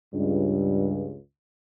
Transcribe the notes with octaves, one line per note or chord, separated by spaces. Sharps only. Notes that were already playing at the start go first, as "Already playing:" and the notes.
C#2 G2